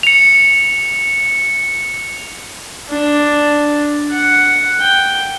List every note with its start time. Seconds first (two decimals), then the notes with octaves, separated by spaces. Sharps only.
0.03 C#7 F7
2.90 D4
4.11 F#5
4.81 G5